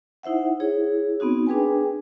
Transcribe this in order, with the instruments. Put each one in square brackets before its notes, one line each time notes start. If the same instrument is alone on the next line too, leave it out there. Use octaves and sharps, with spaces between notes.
[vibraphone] D#4 E4 C5 E5 F#5
E4 G#4 C#5
B3 C4 D#4 F#4
D4 G#4 B4 G5 G#5